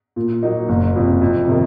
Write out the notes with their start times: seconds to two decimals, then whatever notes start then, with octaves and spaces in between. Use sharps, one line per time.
0.16 A#2
0.43 F#3 A#3 D#4
0.69 F#1
0.96 F2 C3
1.21 F2
1.48 C3 D#3